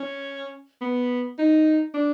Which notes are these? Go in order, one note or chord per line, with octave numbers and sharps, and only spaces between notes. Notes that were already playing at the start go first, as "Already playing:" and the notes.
Already playing: C#4
B3
D#4
D4